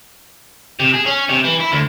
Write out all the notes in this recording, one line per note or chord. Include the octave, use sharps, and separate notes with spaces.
C3
G#4
C#4
C3
E3
E4
D2